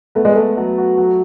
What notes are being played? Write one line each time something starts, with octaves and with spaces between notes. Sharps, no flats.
A3 B3
G#3
A3 A4
F#3
F#4
F#3